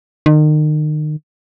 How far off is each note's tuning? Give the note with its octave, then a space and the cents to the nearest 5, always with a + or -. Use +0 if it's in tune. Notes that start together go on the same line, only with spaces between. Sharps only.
D#3 -35